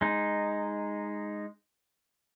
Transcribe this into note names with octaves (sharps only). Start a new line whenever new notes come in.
G#3 D#4